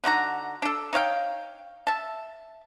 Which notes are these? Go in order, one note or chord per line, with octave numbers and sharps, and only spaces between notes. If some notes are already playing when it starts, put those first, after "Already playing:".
D3 D#4 F#4 A#5
D4 A4
D#4 C#5 F5 G5
E5 A5